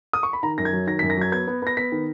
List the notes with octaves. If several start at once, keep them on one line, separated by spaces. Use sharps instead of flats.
D#6
C#6
B5
D#3 A#5
F#2 A#6
G#6
F#3
D#3 A#6
B6
F#2
A#6
F#3 G#6
B3 G#6
B3
B3 A#6
B3 B6
D#3